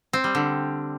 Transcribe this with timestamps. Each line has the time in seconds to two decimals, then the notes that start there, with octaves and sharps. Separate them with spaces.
0.13 C4
0.24 G3
0.35 D3